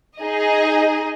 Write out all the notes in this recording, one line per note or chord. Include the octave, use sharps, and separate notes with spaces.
D#4 G#4 D#5